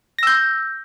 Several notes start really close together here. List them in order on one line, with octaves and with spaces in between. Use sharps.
A#6 E6 G6